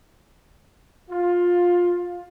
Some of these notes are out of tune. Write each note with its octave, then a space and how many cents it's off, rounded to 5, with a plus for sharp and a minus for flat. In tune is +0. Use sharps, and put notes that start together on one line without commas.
F4 +15